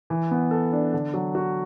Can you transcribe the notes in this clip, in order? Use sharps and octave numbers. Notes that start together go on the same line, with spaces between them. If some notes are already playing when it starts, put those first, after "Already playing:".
E3
B3
A4
D4
D3
F#3
F#4